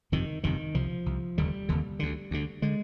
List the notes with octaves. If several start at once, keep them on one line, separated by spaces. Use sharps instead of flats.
G1 F2 C3 D#3
G1 F2 C3 D#3
C2 C3 F3
C2 C3
F1 D#2 D3 G3
F1 D#2 D3
D2 D3
D2 D3
D3 G#3